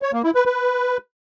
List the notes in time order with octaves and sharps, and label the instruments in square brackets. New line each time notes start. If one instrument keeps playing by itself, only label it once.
[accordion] C#5
A#3
E4
B4
B4